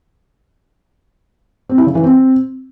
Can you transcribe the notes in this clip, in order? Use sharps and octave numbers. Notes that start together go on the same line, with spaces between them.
C4
E4
C#3
E3
C4